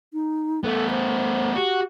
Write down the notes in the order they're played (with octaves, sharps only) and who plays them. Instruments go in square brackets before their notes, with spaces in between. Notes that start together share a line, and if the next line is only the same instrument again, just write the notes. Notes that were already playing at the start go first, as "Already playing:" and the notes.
[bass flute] D#4
[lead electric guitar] A3 B3 [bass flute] A4
[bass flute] C5
[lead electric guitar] F#4 [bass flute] G4